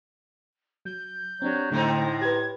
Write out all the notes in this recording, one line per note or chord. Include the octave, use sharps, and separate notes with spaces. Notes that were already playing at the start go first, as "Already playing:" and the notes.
F#3 G6
F#3 C4 D4 G4
A2 D3 G#3 A3 C4 D#4
G4 B4 G#6